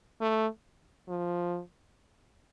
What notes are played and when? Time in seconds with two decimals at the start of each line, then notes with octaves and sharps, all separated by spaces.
0.21 A3
1.08 F3